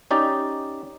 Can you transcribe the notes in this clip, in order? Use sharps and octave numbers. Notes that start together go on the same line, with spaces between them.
C#4 D#4 G4 D5